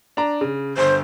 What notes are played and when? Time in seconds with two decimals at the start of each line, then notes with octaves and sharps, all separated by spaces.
0.17 D4 A#5
0.41 C#3
0.77 G1 C5